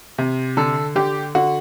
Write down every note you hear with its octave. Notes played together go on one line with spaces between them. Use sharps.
C3
D3 A4
D3 G4
D3 F#4